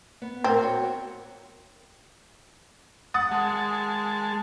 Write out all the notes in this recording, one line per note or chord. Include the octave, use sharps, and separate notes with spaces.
B3
A2 C4 A#4
F#4 C#5
F#5 D#6 A6
G#3 A5